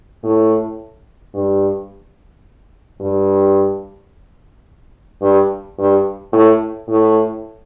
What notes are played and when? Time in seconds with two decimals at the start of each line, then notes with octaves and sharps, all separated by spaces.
0.24 A2
1.34 G2
3.01 G2
5.22 G2
5.78 G2
6.33 A2
6.88 A2